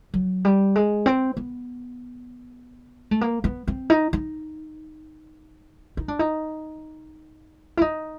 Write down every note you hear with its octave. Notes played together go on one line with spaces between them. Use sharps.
F#3
G3
G#3
C4
B3
A3
A#3
B3
C4
D#4
D#4
D#4
D4
D#4
E4
D#4